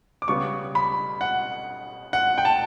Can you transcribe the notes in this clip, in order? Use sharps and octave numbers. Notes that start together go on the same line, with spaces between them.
D6
C#3 G3 B3 C#6
B5
F#5
F#5
G5
A5